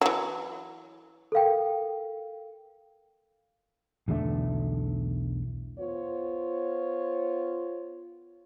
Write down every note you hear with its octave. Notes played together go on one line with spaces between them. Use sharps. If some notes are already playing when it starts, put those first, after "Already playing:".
E3 F#3
A4 A#4 F5 G5
B1 E2 D3 A3
B3 F4 C5 C#5